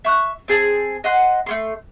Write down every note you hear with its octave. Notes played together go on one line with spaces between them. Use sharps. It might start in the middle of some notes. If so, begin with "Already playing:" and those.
E5 C#6 F#6
C4 G#4 A5
D#5 F#5 C6
A3 A#3 C6